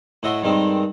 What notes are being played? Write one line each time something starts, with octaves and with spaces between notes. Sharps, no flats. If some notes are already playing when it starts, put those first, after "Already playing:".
A2 F#4 D#5 E5 C6
G2 D#3 G#3 C4